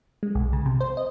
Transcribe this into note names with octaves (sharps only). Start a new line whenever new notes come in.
G#3
B1
C#3
C3
C5
D#5